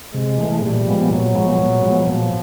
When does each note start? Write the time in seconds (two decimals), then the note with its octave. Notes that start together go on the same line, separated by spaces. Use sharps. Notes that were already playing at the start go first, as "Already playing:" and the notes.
0.13 C3 G#3
0.37 E3 A3
0.62 A#2 G3
0.87 F3 G#3 B3
1.10 A#2 F#3
1.34 F3 G#3 B3
1.58 A#2
1.82 F3 G#3 B3
2.06 A#2 F3